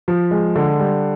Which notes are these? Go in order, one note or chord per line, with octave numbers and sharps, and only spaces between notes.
F3
G#3
D3
G3